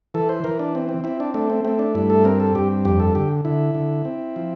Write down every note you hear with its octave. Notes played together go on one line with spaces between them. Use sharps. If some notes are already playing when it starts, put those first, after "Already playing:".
E3 A4
C5
E3 A#4
D4
C4
C4
C4 E4
D4
A3 D4
C4
A3 C4
D4
G2 E4
A4
C4 A#4
A4
G2 G4
F2 G4
A4
D3 G4
D3 E4
D3
C4
F3